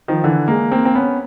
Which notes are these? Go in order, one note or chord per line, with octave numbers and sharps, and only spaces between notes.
D#3 F3
D3 E3
G#3 A#3
A#3 C4
C4
B3 C#4